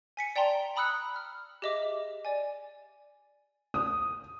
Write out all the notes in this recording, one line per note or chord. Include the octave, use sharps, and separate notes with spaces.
G#5 B6 C#7
D5 G5 A5 A#5 C6
A#5 B5 D#6 E6 F#6 C#7
F6
G4 G#4 D#5 E5 D6
D5 G#5
D#6